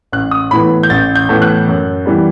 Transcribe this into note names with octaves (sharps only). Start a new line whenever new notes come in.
A1 F#6
D#6
A2 E3 B3 B5
G6
A1 A6
G6
A2 E3 B3
F#6
F#2
E3 G3 B3